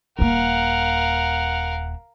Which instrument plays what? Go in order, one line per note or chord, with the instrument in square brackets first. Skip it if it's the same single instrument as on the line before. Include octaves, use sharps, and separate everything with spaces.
[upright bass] D#1 A#3 [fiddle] A#4 F5 [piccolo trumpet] F#5